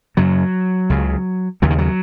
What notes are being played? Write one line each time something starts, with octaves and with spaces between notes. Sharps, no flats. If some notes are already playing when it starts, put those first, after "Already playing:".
F#2 C#3 F#3
C#2 C#3
D#2 C#3 F#3
D#3
F#3